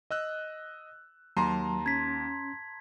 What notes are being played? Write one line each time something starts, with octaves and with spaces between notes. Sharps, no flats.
D#5 E6 F#6
D#2 F#3 A5 A#5 C6
C#4 G#6 B6